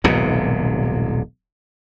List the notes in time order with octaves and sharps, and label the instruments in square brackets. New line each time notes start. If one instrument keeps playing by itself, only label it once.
[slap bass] D#1 B1 G#2 C3